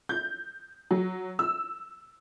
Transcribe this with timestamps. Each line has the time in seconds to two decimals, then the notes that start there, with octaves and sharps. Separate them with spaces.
0.09 G6
0.91 F#3
1.39 E6